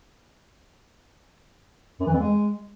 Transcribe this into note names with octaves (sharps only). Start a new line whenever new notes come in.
F#2
E3
F2
G#3